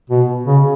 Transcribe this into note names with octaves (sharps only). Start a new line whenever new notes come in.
B2
C#3